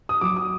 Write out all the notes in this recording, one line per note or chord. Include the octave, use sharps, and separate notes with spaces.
D#6
F#3 D6
D#6